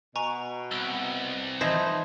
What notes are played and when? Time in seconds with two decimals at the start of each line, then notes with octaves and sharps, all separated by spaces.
0.16 B2 G#5 A#5 C#6
0.71 C2 E6 D7
1.61 E3 F3 D#4 C5 A#6